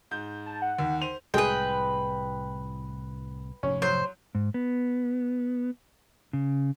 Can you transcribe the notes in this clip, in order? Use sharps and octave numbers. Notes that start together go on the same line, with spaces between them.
G#2 G6
A5
F#5
D#2
C5 D#7 F7
C2 A2 G#3 G#4 B4 G5
F1 G#2 C#4
F#3 C5
G#2
B3
C#3